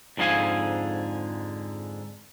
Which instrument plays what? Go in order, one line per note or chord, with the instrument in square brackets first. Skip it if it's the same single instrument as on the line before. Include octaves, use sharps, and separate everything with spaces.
[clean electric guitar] F2 G#2 D3 G#4 F5 G#5